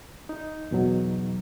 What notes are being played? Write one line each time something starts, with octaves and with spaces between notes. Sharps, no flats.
D#4
E2 B2 F#3